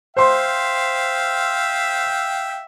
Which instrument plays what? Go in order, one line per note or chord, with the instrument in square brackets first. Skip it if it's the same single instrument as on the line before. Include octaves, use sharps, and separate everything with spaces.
[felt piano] C5 C6 [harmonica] E5 F5 G5